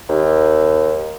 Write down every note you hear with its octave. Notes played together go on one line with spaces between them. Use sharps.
D#2